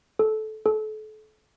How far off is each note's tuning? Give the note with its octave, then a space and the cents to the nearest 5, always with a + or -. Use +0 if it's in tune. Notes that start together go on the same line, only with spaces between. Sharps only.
A4 -20
A4 -35